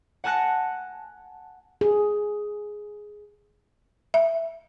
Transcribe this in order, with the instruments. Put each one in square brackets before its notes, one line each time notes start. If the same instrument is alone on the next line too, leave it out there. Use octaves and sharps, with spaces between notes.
[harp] F#5 G#5 A5 F#6 A#6 C#7
[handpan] G#4
[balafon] E5